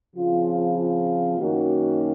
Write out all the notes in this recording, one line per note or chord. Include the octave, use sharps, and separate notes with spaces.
C#3 F3 C4 F4
F4
F#2 D#3 A#3 C#4 F#4